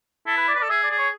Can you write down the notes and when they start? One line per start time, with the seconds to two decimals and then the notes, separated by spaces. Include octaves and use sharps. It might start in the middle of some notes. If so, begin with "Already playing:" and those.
0.26 E4 A4
0.37 B4
0.48 D5
0.55 B4
0.59 D5
0.63 A4
0.69 G#4 E5
0.83 D5
0.91 G#4
0.98 C#5